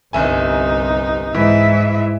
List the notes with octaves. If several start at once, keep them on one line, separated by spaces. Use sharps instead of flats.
G1 C2 D#4 E5 G#5
G#2 E3 E5